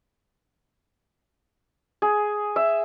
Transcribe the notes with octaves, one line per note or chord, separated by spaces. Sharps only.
G#4
E5